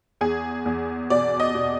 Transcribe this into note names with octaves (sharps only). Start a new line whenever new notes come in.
E2 G#4
E2
B2 D5
D#5
B2